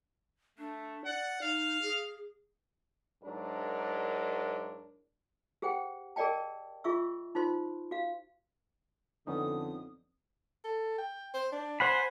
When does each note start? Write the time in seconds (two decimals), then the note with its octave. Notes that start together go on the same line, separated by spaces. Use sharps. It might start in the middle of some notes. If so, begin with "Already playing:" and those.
0.59 A3 D4
1.05 D5 F#5
1.42 D#4 F5
1.82 G#4
3.23 G#2 F#3 D4 E4 A#4
5.62 G4 G#4 C5 F#5 G5
6.16 G#4 A#4 D5 D#5 G5 A5
6.84 F4 G#4 E5 C#6 E6
7.35 D#4 F4 C5 C6
7.91 F#4 F5
9.27 F2 D3 B3 C#4 D#4 D#6
10.65 A4
10.98 G5
11.34 C5
11.52 D4
11.80 C5 F#5 G#5 B5